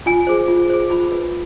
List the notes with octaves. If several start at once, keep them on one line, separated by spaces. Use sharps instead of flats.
F4 G#5
G#4 C5
F4
G#4 C5
F4 B5
B4